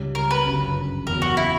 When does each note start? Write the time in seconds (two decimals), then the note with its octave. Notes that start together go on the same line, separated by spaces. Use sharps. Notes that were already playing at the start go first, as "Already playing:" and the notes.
Already playing: C#2 C#3 G3 C#4
0.15 A#4
0.31 B4
0.46 G1 F#2 C#3
1.07 E2 C#3 F#3 A#4
1.22 F#4
1.37 E4